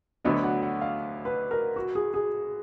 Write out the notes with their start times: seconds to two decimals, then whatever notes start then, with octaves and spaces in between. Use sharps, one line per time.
0.25 D2 D3 F#3 B3 D4 D#5
0.44 F#5
0.62 F#5
0.81 F5
1.25 B4
1.51 A#4
1.76 F#4
1.95 G#4
2.14 G#4